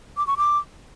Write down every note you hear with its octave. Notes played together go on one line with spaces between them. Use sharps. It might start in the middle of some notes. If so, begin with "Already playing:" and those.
D6
C#6
D6